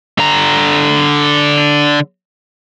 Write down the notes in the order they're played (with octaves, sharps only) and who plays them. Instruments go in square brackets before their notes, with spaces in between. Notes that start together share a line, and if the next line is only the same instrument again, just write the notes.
[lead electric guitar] D3 A#5